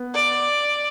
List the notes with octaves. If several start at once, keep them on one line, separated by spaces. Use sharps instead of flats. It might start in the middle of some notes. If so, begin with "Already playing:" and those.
Already playing: B3
D5